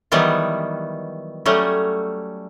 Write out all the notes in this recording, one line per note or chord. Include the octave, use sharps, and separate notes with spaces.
D#3 E3 F#3 G3 B3
F#3 G3 A3 C#4